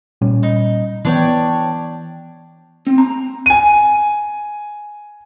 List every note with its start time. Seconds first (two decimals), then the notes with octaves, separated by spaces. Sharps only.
0.21 A#2 G3 C#4
0.43 D#4
1.05 E3 B3 D4 C#5 G5
2.87 C4
2.98 A#5
3.46 G#5 D#7